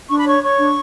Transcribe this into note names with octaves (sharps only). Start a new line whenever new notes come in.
D4 C#6
B5
C#5 C#6
C#5 C#6
D4